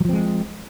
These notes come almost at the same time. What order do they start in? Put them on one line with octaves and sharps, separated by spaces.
F#3 F3 C4 G#3